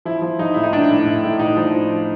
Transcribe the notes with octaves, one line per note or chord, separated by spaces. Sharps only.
F3 E4
F3
F3 D#4
A2 E4
D#4
A2 D4
A2
A2
A2
F3 D#4
F3